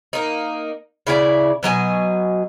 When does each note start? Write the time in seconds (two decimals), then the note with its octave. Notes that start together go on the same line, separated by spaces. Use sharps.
0.13 A#3 D#4
1.07 C#3 E4 G4 D5
1.63 B2 F#3 D#5 G#5